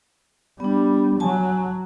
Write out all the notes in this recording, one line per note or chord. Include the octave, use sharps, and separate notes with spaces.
G3 B3 D4
F#3 G#5 A5